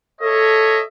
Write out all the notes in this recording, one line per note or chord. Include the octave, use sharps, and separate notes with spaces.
A4 C#5 D#5 E5